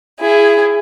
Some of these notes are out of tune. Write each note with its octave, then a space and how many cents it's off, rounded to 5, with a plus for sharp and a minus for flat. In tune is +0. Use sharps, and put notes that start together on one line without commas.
E4 +25 G#4 +0